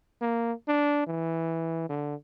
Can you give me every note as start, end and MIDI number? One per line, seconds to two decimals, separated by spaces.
0.21 0.53 58
0.68 1.05 62
1.07 1.88 52
1.89 2.15 50